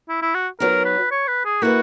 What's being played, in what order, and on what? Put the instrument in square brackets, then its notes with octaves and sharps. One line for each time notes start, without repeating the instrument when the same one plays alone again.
[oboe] E4
E4
F#4
[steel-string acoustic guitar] F#3 B3 D#4 [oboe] A#4
[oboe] B4
C#5
B4
G#4
[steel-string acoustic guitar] A#3 E4 B4 [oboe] F#4